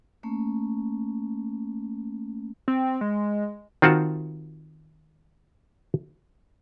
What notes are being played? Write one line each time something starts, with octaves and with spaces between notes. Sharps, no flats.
A3 A#3 C#4
C4
G#3
D#3 C4 F4 F#4 F#5 A5